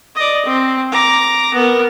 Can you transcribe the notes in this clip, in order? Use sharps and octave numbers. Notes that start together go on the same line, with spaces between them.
D5 D#5
C4
A#5 D6
B3 A#4